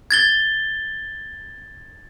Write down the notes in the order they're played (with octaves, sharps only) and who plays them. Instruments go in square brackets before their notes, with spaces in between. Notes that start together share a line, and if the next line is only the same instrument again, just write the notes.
[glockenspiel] G#6 A6 G7